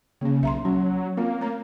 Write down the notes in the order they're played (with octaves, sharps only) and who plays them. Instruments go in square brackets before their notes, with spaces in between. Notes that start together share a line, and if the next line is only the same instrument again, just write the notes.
[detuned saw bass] C#3 [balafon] A#3 C#4
[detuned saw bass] B1 [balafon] E5 A#5 C6
[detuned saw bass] F#3 [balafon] C#4
[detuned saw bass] A#3 [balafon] C4 F4
[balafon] A3 C#5 A#5